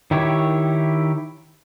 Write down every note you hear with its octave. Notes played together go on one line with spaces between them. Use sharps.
D#3 E4 G4 C#5